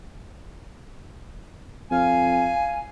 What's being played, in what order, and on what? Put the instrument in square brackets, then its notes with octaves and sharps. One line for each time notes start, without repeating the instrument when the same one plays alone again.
[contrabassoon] F2 [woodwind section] F5 G#5